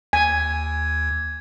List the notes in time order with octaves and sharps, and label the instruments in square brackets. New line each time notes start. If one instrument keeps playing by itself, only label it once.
[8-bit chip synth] D#2 [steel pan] G#5 [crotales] G#6